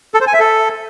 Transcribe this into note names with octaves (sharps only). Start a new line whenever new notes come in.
A4
C5
G#5
E5
A4